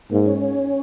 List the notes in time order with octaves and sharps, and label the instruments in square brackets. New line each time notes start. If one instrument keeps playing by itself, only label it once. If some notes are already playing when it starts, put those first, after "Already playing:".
[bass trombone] G#2 [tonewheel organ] A#3
[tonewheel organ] C#4